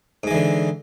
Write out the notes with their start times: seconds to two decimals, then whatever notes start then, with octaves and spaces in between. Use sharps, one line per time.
0.23 G#2
0.27 G#3
0.31 E3
0.34 D3